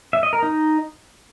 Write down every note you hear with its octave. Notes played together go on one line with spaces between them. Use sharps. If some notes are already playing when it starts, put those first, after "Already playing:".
E5
D#5
A#4
D#4